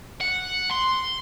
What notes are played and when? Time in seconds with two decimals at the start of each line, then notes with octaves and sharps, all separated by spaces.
0.21 F#5
0.71 C6